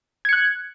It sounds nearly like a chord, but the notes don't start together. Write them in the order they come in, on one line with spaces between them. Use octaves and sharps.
G#6 C#7 F#6